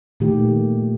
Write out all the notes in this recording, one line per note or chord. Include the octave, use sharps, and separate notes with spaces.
A#2 D#3 A3 G4